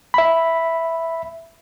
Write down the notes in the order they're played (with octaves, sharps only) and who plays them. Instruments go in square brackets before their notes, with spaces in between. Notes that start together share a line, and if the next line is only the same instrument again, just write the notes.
[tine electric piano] E5 B5